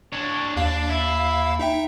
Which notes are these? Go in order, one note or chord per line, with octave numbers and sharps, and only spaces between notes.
D4 C#5
D#2 D4 F5
E4
D#4 E5 G5